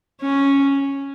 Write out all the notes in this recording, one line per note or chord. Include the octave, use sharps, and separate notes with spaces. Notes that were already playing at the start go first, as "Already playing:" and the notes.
C#4